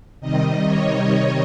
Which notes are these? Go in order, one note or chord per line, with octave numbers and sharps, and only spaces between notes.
C3 D#3 G3 D#5
C#5